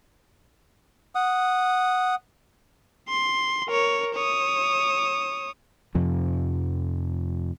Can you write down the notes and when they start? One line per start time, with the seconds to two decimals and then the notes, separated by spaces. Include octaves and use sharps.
1.15 F#5 D#6
3.09 C6
3.69 A#4 C#5
4.15 C#5 D#6
5.95 F2 C3 F3